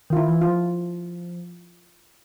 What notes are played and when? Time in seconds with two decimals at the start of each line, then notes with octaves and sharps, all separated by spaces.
0.10 D#3 F4
0.17 E4
0.28 E3
0.41 F4
0.47 F3